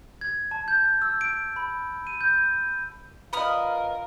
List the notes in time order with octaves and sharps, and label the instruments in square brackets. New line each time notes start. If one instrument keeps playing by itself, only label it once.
[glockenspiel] G#6
A5
G6
E6
D7
B5
D#7
G6
[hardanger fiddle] F4 A#4 [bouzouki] B4 D#5 [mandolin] B5 D#6 F6